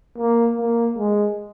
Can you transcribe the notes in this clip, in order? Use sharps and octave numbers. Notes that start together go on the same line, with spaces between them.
A#3
A#3
G#3